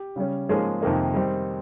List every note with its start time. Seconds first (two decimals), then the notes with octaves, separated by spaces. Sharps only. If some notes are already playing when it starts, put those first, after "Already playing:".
Already playing: G4
0.16 C#3 G3 C#4
0.49 G#2 F3 G#3 A#3 C#4 G#4
0.81 F2 C3 D#3 A#3 D#4
1.14 D#3 G3 C4 D#4